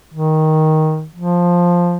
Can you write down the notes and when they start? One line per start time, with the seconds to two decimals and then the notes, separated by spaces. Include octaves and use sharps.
0.14 D#3
1.16 F3